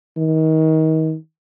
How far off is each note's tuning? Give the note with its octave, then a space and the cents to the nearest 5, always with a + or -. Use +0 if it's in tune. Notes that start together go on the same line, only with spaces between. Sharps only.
D#3 +30